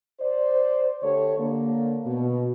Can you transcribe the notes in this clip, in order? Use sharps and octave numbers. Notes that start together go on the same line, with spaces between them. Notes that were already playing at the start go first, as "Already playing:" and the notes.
C5 D5
D3 A3 G4 A4 C#5
D3 A#3
B2